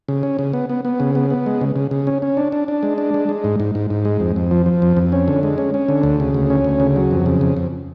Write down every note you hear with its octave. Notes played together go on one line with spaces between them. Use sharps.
C#3
C#4
C#3
B3
B3
B3
C#3
B3
B3
G#3
C#3
C#3
C#3
C#4
C#4
D4
D4
D4
G#3
D4
G#3
G#3
G#2
G#2
G#2
G#2
G#3
F2
F2
F3
F3
F2
F2
C#4
D3
G#3
C#4
C#4
D3
D2
C#3
D2
C#4
D2
C#3
F#3
F2
C#3
F2
F2